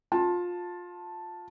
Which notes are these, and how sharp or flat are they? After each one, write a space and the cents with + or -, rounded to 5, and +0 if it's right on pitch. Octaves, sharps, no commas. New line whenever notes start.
F4 +20 A5 +0